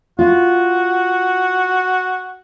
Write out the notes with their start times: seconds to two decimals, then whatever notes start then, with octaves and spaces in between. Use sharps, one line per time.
0.19 F4 F#4